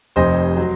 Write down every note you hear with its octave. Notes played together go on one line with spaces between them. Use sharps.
F1 F2 C3 C5 D#5
F#3